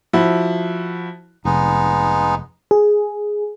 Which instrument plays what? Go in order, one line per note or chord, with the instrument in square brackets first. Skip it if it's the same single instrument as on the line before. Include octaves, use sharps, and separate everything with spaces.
[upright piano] F3 E4 F#4
[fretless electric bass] F1 [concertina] G#3 B3 D#4
[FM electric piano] G#4